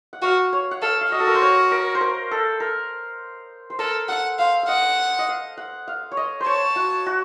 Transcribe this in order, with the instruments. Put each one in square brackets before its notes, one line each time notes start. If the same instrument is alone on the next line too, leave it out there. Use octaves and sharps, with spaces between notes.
[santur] F#5
[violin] F#4 [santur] F5
[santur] C#5
F#5
[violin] A4 [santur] F5
[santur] F5
[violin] F#4 [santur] D#5
[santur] A4
A#4
C5
C#5
A#4
C5
A#4
A4
A#4
C5
[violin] A4 [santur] A#4
[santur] A4 [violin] F#5
[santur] C5 [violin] F5
[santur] F5
[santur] D#5 [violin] F#5
[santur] D#5
F5
F#5
F5
C#5
D#5
C5
[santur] C#5 [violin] A5
[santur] F#4
F#4